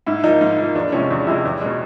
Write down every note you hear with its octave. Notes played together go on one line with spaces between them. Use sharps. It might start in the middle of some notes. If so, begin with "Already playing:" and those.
G#2 E4
F3 A#3 D#4
G#2
F3 A#3
E2 D4
C3 F3 G#3 C#4
E2 D4
C3 F3 G#3 E4
E2
B2 G#3